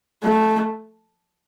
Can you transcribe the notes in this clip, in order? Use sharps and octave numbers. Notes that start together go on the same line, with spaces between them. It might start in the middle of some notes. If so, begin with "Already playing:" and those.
A3